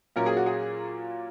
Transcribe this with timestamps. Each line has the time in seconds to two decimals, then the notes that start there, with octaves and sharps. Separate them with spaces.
0.16 A#2 F#3 A#3 C#4 A#4
0.26 G#4
0.37 F#4
0.46 G#4